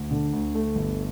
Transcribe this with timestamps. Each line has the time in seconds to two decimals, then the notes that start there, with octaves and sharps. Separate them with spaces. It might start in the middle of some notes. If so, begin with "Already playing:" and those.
Already playing: D2
0.11 D3
0.33 D2
0.55 A3
0.75 G1